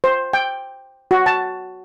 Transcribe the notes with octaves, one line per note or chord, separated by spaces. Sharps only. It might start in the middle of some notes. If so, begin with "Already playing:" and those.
C5
G5
F#4
A5